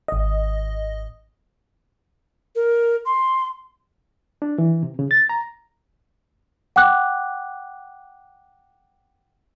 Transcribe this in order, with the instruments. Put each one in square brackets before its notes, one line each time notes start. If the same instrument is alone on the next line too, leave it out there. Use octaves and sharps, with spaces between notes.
[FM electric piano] G#1 D#5
[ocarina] A#4
C6
[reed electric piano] D4
E3
C3
C#3
A6
A#5
[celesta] F#5 G5 D6 F#6